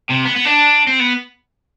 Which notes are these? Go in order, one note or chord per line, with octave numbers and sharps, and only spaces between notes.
C3
B3
B3
D4
C4
B3